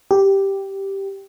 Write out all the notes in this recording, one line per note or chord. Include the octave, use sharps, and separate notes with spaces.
G4